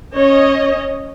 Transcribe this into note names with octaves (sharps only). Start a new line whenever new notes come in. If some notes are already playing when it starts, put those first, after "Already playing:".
C#4 C#5 D#5